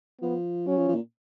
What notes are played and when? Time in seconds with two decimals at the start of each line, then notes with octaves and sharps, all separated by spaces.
0.21 F3 B3
0.66 F#3 C#4
0.77 F3
0.88 F3
0.95 A#2